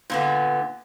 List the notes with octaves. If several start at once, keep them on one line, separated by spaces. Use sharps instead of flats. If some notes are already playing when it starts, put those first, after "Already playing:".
A#2 D3 B3